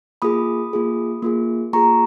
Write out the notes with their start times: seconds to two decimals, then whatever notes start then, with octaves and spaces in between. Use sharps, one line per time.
0.22 A#3 F4 G#4 B5 D#6
0.73 A#3 F4 G#4
1.22 A#3 F4 G#4
1.73 A#3 F4 G#4 A#5 C#6